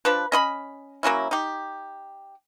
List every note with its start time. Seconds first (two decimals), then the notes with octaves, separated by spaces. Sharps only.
0.05 F3 D4 B4
0.32 C#4 D#5 B5
1.03 F#3 A#3 C#4 E4
1.31 D#4 G4